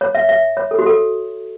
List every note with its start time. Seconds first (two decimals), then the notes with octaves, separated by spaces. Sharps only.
0.01 C#5
0.15 E5
0.29 E5
0.57 C#5
0.71 A4
0.79 F#4
0.87 A4